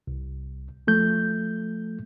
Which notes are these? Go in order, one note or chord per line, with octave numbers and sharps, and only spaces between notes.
C2
F3 A3 G6